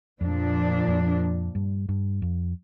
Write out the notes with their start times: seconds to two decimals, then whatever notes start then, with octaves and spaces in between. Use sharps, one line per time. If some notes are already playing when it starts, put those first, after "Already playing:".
0.21 F2 A#2 F3 D4
0.88 F2
1.55 G2
1.89 G2
2.22 F2